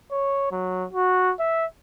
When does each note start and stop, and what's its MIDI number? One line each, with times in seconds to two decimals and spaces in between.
0.11 0.47 73
0.52 0.86 54
0.93 1.33 66
1.40 1.66 76